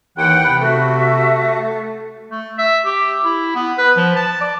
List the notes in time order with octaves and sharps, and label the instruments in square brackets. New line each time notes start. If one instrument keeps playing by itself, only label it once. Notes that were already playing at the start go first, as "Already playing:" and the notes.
[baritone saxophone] D#2 [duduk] E3 [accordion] F#5 G5 [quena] F#6
[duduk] C3 [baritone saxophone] B3
[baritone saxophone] A3 [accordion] F#4 [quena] E5
[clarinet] A3
E5
G4
E4
B3
B4
F3
A5
D5